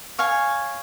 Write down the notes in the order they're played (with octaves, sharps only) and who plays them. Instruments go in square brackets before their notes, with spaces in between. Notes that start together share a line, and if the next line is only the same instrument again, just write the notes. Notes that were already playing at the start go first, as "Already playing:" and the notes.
[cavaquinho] C#5 F5 G#5